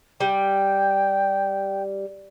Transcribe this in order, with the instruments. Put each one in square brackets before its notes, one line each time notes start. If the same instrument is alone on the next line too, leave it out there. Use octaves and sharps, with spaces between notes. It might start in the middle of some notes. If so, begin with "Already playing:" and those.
[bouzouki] G3 [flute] G5